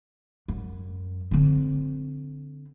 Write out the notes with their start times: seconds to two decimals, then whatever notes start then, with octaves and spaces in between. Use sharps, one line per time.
0.48 F#2
1.31 D3 C4